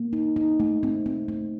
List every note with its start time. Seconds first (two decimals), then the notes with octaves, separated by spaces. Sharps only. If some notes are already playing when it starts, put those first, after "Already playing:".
Already playing: A#3
0.13 D#4
0.36 D#4
0.60 A3
0.83 C4
1.06 C4
1.28 A3